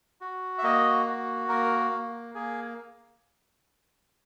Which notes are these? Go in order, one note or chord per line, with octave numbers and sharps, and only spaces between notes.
F#4
E5
A#3 D#5
F#4
A#3 A#4
A#3
A#3 G#4